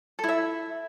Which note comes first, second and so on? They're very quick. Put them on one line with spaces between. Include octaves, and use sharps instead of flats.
A4 E4 E5